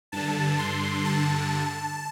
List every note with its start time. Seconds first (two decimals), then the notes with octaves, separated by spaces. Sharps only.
0.12 G2 D3 A5
0.58 C6
1.05 A5